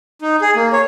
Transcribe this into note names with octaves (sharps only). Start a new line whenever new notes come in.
D#4
G#4
A#3
C#5